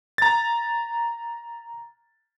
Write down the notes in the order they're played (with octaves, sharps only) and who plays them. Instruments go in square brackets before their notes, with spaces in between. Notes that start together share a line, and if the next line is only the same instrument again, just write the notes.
[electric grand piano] A#5 A6